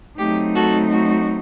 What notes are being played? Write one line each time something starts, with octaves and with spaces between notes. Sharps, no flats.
F#3 A3 C4 D#4 G4
F#4 A4
F#4